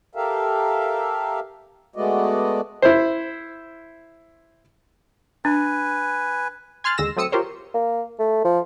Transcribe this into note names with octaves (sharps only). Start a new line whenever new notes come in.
G4 A4 A#4 E5 F5
G#3 A3 B3 F#4 D5 D#5
E4 C5
D4 B4 G#5
G#5 C6 F6 F#6 A6
D#2 D3 G#3 E6 A#6 E7
F#3 A3 C4 D#6 E6 C#7
F4 G4 A#4 C5 C#5
A#3
A3
F3